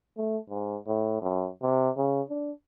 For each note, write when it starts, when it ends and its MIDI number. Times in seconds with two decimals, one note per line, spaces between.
0.18 0.38 57
0.50 0.77 44
0.87 1.17 45
1.22 1.49 42
1.62 1.90 48
1.97 2.22 49
2.29 2.51 62